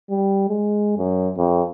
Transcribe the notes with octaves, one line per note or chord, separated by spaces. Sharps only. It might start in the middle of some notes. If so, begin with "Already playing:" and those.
G3
G#3
F#2
F2